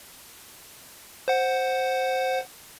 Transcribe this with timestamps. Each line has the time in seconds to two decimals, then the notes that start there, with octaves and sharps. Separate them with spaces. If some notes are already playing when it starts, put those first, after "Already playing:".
1.28 C5 F#5